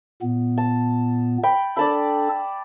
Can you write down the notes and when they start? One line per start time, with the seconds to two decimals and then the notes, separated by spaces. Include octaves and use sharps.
0.22 A#2 B3
0.58 A5
1.43 G5 B5
1.77 D4 A4 D5 A5 B5